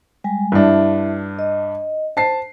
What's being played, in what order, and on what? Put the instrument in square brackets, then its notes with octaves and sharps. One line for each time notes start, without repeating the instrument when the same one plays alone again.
[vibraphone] G3 G#3 G#5
[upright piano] G2 D4 [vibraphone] E4 E5
[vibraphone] D#5
[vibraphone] C5 [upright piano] A5 C7